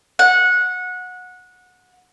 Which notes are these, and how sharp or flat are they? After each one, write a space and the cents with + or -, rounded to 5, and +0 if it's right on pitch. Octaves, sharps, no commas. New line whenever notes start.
F#5 -20